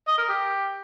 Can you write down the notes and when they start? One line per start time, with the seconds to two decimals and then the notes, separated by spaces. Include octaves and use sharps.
0.08 D#5
0.18 A#4
0.29 G4